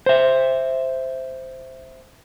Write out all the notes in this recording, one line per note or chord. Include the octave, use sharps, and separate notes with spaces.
C5 E5